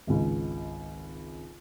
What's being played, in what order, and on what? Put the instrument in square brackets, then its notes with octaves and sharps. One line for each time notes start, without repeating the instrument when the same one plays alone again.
[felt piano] G#1 C#2